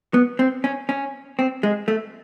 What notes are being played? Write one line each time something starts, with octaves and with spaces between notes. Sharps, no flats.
B3
C4
C#4
C#4
C4
G#3
A3